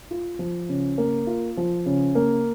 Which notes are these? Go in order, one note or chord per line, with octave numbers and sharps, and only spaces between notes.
F4
F3
C#3
A#3
F4
F3
C#3
A#3